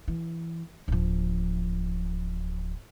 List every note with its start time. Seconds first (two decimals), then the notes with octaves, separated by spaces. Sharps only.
0.08 E3
0.88 D1 F3